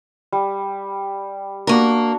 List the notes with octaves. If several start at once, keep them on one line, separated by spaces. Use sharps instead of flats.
G3
A#3 D4 F#4 A#4 D5